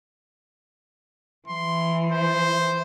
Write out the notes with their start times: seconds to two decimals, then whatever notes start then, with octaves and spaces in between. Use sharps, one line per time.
1.48 E3 C6
2.12 C5